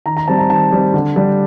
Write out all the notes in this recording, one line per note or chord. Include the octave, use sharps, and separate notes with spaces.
D#3 A#5
A#5
G3 C4 A5
A#5
D#3 A5
G3 C4
D3
G3 D4